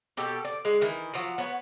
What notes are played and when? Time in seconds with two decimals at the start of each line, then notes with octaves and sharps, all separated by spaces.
0.17 B2 G4 A4
0.45 D5
0.65 G#3
0.81 D#3 E3
1.14 F3 F#3
1.38 B3 C#5